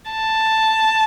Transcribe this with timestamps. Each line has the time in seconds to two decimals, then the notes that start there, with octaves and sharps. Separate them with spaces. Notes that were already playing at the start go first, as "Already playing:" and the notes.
0.11 A5